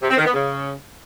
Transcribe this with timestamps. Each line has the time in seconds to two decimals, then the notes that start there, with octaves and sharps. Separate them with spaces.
0.01 C3
0.09 C4
0.17 D#3
0.25 B3
0.34 C#3